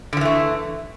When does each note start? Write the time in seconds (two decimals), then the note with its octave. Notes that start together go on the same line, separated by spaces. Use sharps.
0.13 D3
0.17 F3
0.21 E3
0.25 A3